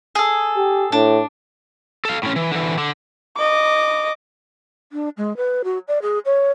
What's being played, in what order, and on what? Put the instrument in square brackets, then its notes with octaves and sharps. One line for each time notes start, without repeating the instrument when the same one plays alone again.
[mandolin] G#4 A4
[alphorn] G4
[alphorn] A2 [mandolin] D4
[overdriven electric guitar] A4 F5
A2 C#4
E3
D3 E3
D3
[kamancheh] D#5 D6
[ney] D4
G#3
B4
F#4
D5
G#4
C#5